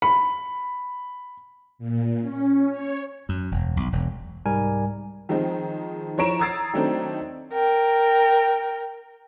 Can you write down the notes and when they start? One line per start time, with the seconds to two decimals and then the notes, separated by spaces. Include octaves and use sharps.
0.02 B5
1.79 A#2
2.21 C#4
2.70 C#5
3.29 F#2
3.51 E1
3.77 B1
3.93 E1
4.46 C2 G#2 G3 A#4 G#5
5.29 D#3 F3 G#3 C4 D#4
6.18 F3 E4 C#5 A#5 D7 E7
6.39 A#5 D#6 E6 G#6 A6 C7
6.74 D#3 F#3 A3 C4 D4 D#4
7.53 A#4 G5